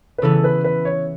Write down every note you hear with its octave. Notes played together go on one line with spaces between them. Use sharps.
B4
C#3 E3 B3 E4 G#4 A4
B4
B4
C#5